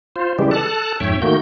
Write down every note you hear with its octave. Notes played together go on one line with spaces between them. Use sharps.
F4 C5
C#3 E3 G3 G#3 G4
A4 A5 F#6
F2 G#2 C#5 E5 G5
D#3 A3 A#3 F#4 G6